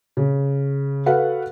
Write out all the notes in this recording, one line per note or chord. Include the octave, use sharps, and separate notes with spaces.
C#3
F#4 A4 B4 F5 F#5